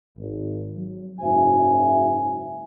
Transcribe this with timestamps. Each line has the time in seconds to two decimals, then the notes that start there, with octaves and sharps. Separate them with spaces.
0.17 G#1
0.76 F#3
1.19 F#1 G#2 F#4 C5 E5 G#5